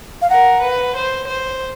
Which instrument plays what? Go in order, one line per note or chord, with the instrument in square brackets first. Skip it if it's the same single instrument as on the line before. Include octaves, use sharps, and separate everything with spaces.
[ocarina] F5
[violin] A#4 [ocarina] F#5
[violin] B4
C5
C5